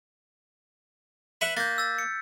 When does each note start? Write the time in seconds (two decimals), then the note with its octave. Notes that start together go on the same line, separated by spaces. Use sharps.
1.41 B4 E5 F#5 F#6 B6
1.57 A#3 G6 A6
1.78 E6 A6
1.98 C#7